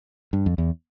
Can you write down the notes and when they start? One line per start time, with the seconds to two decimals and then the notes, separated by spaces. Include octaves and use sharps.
0.33 G2
0.46 F2
0.58 E2